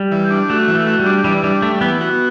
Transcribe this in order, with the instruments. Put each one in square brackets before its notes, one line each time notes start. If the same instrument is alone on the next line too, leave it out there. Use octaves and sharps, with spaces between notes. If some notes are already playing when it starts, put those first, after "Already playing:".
Already playing: [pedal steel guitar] G3
[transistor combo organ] E3
D4
[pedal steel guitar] A3 [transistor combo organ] F#4
[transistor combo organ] E3
[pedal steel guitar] A3
[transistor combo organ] F#4
[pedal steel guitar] G3
[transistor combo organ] D4
[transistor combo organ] E3 [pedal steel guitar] G3
[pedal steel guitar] G3 [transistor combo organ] D4
[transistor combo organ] G3 [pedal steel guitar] A3
[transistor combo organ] E3 [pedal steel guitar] B3
[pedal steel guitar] B3 [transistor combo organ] F#4